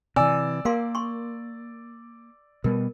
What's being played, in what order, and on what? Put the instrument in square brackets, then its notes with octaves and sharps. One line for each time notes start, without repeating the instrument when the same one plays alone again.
[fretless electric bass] C3 E3 [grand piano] D5 E6 [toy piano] G#5
[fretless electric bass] A#3 [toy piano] A#4 F5 C6
[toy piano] C6 C#6
[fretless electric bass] B2 G3 B3 [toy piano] A#4